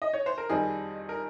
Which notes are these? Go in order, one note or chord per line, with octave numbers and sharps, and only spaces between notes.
D#5
C#5
C5
A#4
F2 D#3 G3 C4 D#4 G#4
A#4